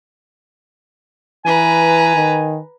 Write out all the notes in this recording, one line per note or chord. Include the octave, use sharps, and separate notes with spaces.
E3 B4 G#5 A#5
D#3